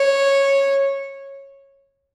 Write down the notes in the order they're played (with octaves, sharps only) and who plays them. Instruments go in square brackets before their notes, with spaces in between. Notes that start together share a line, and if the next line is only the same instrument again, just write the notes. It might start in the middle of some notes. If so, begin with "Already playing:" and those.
Already playing: [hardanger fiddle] C#5